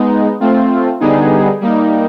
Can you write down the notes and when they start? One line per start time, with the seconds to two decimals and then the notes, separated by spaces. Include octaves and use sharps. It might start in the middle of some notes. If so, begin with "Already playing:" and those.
Already playing: G#3 B3 D#4
0.40 A3 C4 F4
1.00 D3 G3 B3 D#4 G#4
1.61 G3 A#3 D#4